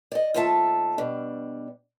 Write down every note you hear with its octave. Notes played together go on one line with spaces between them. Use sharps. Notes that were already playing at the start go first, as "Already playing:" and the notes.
D5 D#5
D#2 A3 F4 A4 E5 A5
B2 G3 D4